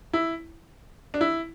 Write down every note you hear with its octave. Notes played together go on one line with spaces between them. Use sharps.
E4
D4
E4